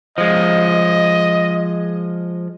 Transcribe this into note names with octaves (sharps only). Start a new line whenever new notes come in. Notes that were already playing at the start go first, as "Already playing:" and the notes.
F3 G#3 D#5